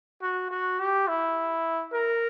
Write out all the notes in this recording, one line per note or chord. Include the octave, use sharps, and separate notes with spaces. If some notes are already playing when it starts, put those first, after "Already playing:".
F#4
F#4
G4
E4
A#4